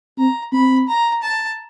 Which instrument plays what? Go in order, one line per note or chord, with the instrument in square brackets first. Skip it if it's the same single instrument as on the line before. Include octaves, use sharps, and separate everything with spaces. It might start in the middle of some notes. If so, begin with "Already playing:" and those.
[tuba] C4 [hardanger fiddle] A#5
[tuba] C4 [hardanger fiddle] B5
[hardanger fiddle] A#5
A5